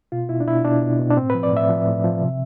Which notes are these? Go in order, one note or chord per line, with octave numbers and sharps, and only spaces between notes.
B2 F4
B2 E4
D4
B2 E4
B2 D4
B2
B2
D4
A2 C4
F3 B4
D5
A2 E5
F3
A2
F3
C3